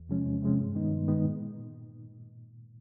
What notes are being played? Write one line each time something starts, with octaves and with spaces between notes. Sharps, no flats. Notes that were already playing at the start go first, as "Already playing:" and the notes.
Already playing: E2
C3 F3 G#3 C#4
E2
C3 F3 G#3 C#4
G2
D#3 G#3 B3 D#4
G2
D#3 G#3 B3 D#4
A#2